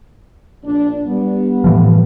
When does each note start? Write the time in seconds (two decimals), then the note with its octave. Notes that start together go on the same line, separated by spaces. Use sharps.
0.65 A#1 D4
1.07 G3 B3
1.64 A2 E3 F3